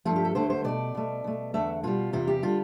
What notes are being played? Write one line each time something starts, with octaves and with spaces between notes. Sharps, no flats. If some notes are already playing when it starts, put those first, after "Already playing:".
G2 F3 A3 F4
G4
A4
D2 D3 A3 C5
C5
B2 A3 D5
B2 A3
B2 A3
E2 D3 A3 E5
B2 G3 F4
E2 C3 E3 F4
G4
D3 G3 F4